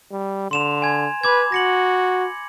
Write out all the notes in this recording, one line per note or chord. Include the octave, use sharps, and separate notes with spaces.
G3
D3 C6 E7 F7
G#5 G#6
B4 B5 D6 G#6
F#4 A#6 C#7 F#7